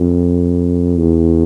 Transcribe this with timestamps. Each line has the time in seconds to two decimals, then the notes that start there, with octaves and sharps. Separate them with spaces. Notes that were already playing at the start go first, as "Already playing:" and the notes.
Already playing: F2
0.97 E2